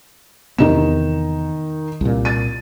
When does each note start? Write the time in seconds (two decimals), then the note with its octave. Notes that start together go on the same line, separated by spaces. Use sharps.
0.58 E2 C3 D#3 B3 D#4 E7
2.01 C2 A#2
2.25 A6 D#7